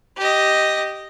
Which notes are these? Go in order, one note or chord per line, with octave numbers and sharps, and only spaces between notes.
G4 D#5